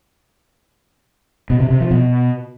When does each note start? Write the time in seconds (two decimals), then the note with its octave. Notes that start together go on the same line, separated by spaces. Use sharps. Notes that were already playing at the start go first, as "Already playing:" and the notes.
1.50 B2
1.60 C3
1.70 C3
1.80 F3
1.91 B2